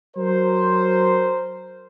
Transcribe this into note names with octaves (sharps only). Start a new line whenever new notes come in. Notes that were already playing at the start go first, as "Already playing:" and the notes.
F#3 A#4 C5